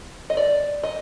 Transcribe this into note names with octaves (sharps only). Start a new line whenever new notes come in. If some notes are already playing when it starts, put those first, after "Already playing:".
D#5
D5
D#5